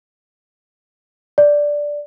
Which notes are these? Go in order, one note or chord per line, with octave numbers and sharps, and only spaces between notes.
D5